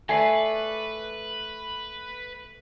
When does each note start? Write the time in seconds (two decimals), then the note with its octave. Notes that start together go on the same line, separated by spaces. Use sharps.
0.09 A3 B4 D5 G#5 C7